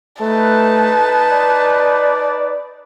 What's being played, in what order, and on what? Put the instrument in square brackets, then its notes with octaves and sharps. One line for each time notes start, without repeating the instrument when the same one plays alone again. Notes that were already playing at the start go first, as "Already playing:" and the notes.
[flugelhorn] A3 [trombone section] D#4 B4 [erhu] A5
[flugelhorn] D5